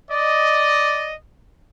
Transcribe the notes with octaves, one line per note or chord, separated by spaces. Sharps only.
D5 D#5